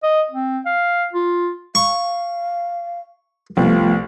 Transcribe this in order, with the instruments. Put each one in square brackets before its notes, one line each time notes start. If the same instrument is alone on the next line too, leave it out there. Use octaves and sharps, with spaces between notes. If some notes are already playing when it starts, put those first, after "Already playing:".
[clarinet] D#5
C4
F5
F4
[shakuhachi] F5 [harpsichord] C#6
[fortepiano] C2 [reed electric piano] F3 A3 B3 [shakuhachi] F4